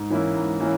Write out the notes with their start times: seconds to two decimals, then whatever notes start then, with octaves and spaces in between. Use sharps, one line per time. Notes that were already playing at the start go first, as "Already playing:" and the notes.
Already playing: G#2
0.10 E3 A#3 C#4 E4
0.36 G#2
0.60 E3 A#3 C#4 E4